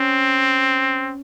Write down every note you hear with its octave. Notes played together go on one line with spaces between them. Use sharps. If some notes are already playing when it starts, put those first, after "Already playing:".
Already playing: C4 C#4